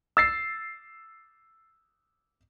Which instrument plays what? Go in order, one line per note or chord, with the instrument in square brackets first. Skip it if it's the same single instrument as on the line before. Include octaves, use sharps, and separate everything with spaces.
[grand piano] E6 A6 C7